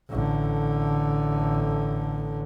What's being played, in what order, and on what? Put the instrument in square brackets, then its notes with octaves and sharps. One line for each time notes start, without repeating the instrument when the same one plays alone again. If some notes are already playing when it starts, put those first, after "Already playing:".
[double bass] A1 D3